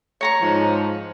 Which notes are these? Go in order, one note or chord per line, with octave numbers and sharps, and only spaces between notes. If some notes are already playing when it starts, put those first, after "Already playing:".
C#5 A#5 C#6
G#2 F3